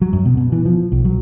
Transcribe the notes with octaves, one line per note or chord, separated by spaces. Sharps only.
F#3
F#2
B2
B2
E3
F3
B1
F#3